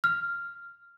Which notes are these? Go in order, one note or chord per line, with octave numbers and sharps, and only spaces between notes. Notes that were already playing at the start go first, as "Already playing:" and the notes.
F6